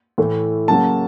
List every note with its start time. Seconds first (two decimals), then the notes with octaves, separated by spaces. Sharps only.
0.18 A2 E3 A3
0.68 C#3 F#3 A#3 A5